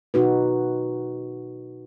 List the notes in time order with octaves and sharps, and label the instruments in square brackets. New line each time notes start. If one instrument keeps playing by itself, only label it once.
[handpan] B2 D#4 F#4 B4